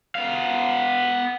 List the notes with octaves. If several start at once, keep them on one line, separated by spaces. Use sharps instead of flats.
B3 F5